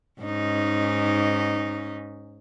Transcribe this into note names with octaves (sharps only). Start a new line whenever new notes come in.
G#2 C#4 D#4